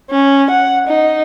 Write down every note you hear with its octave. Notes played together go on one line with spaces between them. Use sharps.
C#4
F#5
D#4